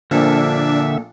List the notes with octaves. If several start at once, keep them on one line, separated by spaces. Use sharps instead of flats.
A#1 A#2 D3 F3 A#3 D4 A4 E5